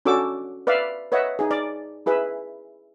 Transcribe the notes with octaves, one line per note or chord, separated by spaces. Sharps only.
C#4 D4 F#4 A4 D6 E6
B4 D5 E5 F5 B5
B4 C#5 D#5 E5 F#5
D#4 G#4
D5
E4 G#4 B4 E5